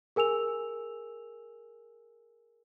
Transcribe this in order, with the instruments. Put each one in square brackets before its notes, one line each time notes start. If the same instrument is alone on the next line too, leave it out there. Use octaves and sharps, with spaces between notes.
[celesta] G#4 A#4 G#5 E6 F7